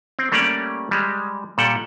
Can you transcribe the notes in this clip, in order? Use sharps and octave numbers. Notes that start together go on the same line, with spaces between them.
C4
G3 A3 A#3 C#4 G4 D5
G3 G#3
A#2 G3 A4 F#5 G5